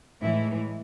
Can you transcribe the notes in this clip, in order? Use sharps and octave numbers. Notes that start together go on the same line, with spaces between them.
A2 E3 G#3 E4